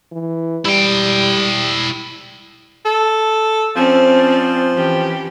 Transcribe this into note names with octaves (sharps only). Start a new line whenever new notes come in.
E3
G3 E4 G5
A4
F3 C4 C#4 D5
E3 C#4 G4